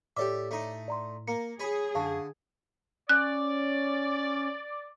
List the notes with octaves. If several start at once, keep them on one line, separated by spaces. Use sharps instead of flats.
A2 G4 A4 C#5 D5 E5 D6
A3 D#4
D5 A#5 C6
A#3 C#7
G#4 C#5 G#5 B5
F#2 D3 F5 A5 C#6
C#4 D5 F#6